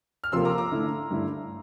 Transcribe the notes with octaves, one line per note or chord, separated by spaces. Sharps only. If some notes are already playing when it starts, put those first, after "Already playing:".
F6
C3 F3 A#3 F4 A4 C6 E6
A#5 D6
A#5 D6
D3 A3 E4 A4
G2 D3 A3 E4